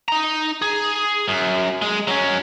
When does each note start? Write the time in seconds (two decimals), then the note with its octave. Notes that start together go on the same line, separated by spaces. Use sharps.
0.08 D#4 A#5
0.62 G#4
1.28 F#2
1.82 G#3
2.08 F#3 C#4